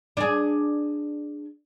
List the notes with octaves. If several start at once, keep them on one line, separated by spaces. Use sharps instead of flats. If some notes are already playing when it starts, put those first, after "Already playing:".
D4 G#4